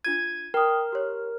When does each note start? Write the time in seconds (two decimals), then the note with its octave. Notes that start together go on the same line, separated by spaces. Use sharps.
0.05 D4 F4 G#6 D#7
0.54 A#4 G5 D#6
0.92 G4 C#5